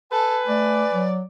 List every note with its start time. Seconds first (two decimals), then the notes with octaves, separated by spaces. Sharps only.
0.12 A4 B4 G#5
0.47 A3 D5
0.93 F#3